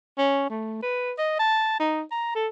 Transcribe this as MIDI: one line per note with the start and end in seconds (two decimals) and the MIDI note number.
0.18 0.48 61
0.50 0.81 57
0.83 1.13 71
1.18 1.38 75
1.39 1.76 81
1.80 2.02 63
2.12 2.31 82
2.35 2.48 69